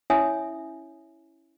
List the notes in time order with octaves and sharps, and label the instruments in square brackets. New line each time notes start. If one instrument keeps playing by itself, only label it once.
[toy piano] C#4 E4 C#5 E5 G#5 D#6